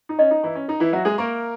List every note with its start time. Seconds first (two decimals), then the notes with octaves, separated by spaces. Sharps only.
0.09 D#4
0.19 C#4 D#5
0.31 D#4
0.43 E3 E4 A#5
0.55 C#4
0.68 D#4 A#4
0.80 E3 E4
0.93 F#3 F#4 E5
1.05 G#3 G#4
1.18 A#3 A#4 C#6